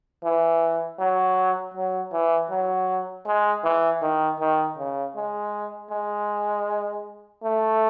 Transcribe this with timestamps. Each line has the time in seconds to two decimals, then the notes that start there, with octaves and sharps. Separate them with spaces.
0.24 E3
0.99 F#3
1.74 F#3
2.13 E3
2.50 F#3
3.26 G#3
3.64 E3
4.02 D#3
4.40 D#3
4.78 C#3
5.15 G#3
5.91 G#3
7.44 A3